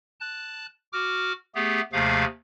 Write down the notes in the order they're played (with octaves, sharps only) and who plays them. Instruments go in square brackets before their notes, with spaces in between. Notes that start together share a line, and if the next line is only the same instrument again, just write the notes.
[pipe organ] A5 F#6
F#4 D6 F6
A3 B3 G4 G#4
D#2 C3 F3 A3 G#4 F5